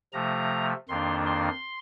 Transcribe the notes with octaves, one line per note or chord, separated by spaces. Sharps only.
C3 F3 A3 A#5
F2 D#3 A#3 D4 C6
C6